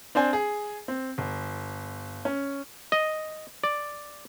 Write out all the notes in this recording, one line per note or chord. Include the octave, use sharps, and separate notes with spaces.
C4 D4 C5 G#5
G#4
C4
G1
C#4
D#5
D5